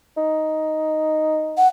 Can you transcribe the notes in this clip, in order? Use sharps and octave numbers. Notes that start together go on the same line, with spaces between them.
D#4
F#5